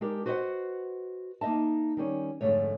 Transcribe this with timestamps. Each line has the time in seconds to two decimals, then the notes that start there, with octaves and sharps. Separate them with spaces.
0.01 G#3 D4 G4 A#4
0.26 F#4 B4 C5 D5 D#5 F#5
1.41 A#3 D#4 D#5 E5 A5
1.97 D#3 G3 C#4
2.41 F2 G#2 D3 F3 A3 C#5